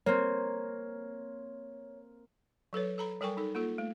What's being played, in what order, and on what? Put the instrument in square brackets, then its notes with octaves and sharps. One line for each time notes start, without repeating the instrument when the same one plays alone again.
[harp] A#3 C4 [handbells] C#5
[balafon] F#3 A4 B4 C#5
A4 A#5 B5
G3 A4 A#4 G5 G#5 C#6
D#4 A4
A#3 F4 A4
A3